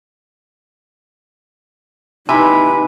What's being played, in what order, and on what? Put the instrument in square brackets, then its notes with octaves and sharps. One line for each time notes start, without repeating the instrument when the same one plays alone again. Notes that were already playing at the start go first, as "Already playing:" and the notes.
[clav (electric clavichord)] C3 [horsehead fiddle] D#4 B4 [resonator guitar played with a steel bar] E4 E5 [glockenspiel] G#5